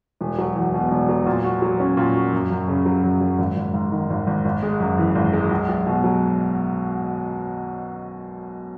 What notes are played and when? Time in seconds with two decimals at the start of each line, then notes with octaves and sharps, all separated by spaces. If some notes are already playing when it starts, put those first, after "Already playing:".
0.21 E1
0.38 F#3
0.56 E2
0.74 B2
0.91 E1
1.09 F#3
1.27 A#2
1.44 F#4
1.62 F#3
1.79 C#4
1.97 A#2
2.15 F#4
2.33 F#2
2.50 F#2
2.68 C#3
2.86 F#3
3.04 F#2
3.21 F#2
3.38 G#1
3.56 G#1
3.74 G#2
3.92 D#3
4.10 G#1
4.27 G#1
4.45 G#1
4.63 G#3
4.80 F#2
4.98 E3
5.15 G#1
5.33 G#3
5.51 B1
5.69 B1
5.86 B2
6.04 F#3